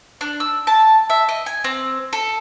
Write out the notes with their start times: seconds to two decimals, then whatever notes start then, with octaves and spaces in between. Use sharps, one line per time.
0.21 D4
0.40 E6
0.67 A5
1.10 E5
1.29 D#5
1.46 G#5
1.64 C4
2.13 A4